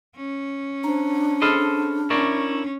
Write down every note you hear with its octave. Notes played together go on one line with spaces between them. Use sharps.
C#4
D4 C5 A#5
G#4 A4 C5 D#5 B5 F6
C#4 E4 A#4 D5 C#6